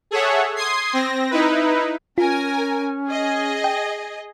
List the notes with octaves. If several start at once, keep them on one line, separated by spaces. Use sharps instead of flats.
G#4 A4 C#5 E5 F#5
C6 D#6 G#6 C7
C4 A#6
D#4 E4 B4
C#4 F4 A#4 G#5
G#4 D#5
G5